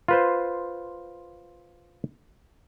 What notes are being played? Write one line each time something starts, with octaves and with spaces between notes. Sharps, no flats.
F4 B4 C5